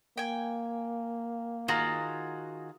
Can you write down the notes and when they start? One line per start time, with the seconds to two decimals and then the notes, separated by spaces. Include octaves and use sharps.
0.17 A#3 G5 G#5
1.68 D#3 F4 F#4 G#4 A#5